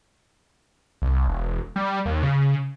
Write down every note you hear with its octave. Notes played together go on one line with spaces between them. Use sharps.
C2
E1
G3
D#2
C#3